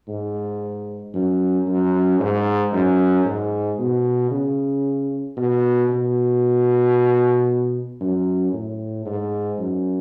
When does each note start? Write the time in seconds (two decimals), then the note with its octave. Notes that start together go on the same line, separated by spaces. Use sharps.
0.08 G#2
1.14 F#2
1.67 F#2
2.20 G#2
2.72 F#2
3.25 G#2
3.79 B2
4.31 C#3
5.37 B2
5.89 B2
8.01 F#2
8.53 A2
9.06 G#2
9.59 F#2